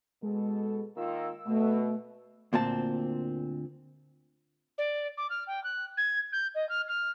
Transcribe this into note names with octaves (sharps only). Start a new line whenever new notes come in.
B2 G#3 A4
D#3 A#3 F4 E6
B2 A3
D2 A#2 C4 A5
D5
D6
F6
G5
F#6
G#6
G6
D#5
F6
F6